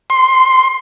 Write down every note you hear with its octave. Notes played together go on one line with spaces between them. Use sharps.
C6